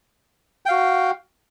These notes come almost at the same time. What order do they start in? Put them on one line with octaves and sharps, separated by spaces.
G5 F5 F#4